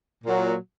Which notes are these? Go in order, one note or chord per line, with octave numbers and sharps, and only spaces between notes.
A#2 F#3